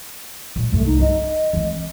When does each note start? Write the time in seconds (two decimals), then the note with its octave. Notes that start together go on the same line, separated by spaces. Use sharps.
0.56 A#1
0.72 C2 G2 A3
0.86 D#4
1.01 D#4 D#5
1.53 E3 C4